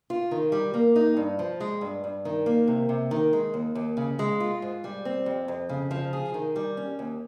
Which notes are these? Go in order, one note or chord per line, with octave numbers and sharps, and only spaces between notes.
F4
D#3
G3
A#3
D#4
G2
F3
G#3
G2
G2
D#3
A#3
C3
C3
D#3
G#3
D#2
D#2
C#3
G#3
F4
G#2
G3
C4
F2
F2
C#3
F3
G#4
D#3
G3
C#4
D#2